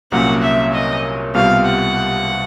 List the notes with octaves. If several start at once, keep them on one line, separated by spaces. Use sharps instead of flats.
C2 A#2 F#3 A#3 C#4 F#5
E5
D#5
C2 B2 G3 C4 F4 F5
F#5